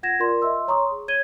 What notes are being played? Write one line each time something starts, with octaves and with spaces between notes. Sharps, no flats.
F4 F#5 G#6 A#6 E7
F4 A#4 D5 C6
D#5 E5 C6 E6
C#5 A#5 C6 C#6 D#6
G#4
C#5 G#6 D#7 G7